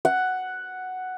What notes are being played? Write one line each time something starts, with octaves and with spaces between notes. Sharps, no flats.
F#5